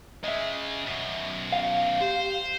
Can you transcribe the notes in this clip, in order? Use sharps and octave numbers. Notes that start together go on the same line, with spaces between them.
C#3 G#3 D#5 E5
F#2 B2
F5
G4 C5